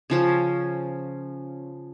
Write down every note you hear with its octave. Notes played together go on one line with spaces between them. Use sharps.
C#3 F3 C#4